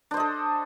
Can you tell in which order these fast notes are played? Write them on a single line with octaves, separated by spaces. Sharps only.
D4 C5 D#5 A4